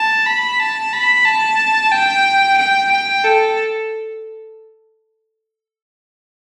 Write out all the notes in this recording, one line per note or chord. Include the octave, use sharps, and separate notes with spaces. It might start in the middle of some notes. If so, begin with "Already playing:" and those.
Already playing: A5
B5
A5
B5
A5
G5
G5
G5
A4